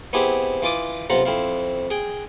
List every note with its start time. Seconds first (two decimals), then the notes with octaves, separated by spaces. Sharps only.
0.13 B3 C4 E4 G4 G#4 C5
0.62 E3 F4 D6 D#6
1.10 B1 C3 F4 C5 F#5 A#5
1.25 F2 C4 E4 F5
1.91 G#4 G5